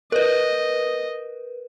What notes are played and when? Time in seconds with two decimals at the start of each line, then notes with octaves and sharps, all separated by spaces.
0.12 A#4 B4 D#5